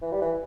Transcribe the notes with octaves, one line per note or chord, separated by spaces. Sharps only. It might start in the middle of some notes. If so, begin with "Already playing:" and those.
E3
G3
E3